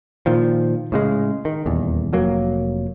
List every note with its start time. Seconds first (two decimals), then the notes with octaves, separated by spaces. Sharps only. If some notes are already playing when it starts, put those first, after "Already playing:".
0.26 A#2 D#3 F3
0.92 A2 C#3 G#3
1.45 D#3
1.66 D#1 E2
2.13 F1 F#3 A#3